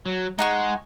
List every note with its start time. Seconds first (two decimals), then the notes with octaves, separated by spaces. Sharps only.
0.06 F#3
0.39 G#3 D#4 F#5 C#6